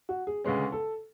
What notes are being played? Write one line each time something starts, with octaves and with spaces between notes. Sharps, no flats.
F#4
G#4
D2 C#3 G#3 C#4 B4
A4